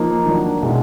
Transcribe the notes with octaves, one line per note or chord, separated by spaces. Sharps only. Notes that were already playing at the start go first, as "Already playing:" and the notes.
Already playing: F3 A#3 D#4
D#3 F#3 A#3 D4
B2 G#3 C#4 E4